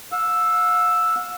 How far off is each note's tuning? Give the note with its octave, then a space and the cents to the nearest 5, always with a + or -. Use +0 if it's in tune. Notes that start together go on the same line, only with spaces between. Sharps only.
F5 +40 E6 +0